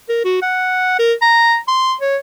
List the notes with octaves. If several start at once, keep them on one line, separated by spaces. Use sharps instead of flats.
A#4
F#4
F#5
A#4
A#5
C6
C#5